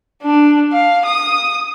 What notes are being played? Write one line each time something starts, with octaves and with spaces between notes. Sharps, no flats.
D4
F5
D#6